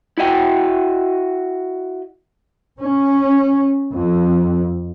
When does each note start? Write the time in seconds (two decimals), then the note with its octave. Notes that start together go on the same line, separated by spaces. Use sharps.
0.18 E4 F#4 D#5 G5
2.79 C#4
3.94 F2